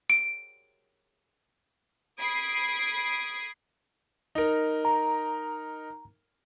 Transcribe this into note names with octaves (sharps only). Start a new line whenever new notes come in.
D7
B5 D#6 G#6 C7 D7
D#4 A#4
A#5